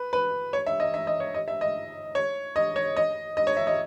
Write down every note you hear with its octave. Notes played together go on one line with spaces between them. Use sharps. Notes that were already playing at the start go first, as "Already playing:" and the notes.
Already playing: B4
B4
C#5
E5
D#5
E5
D#5
C#5
D#5
E5
D#5
C#5
D#5
C#5
D#5
D#5
C#5
E5
D#5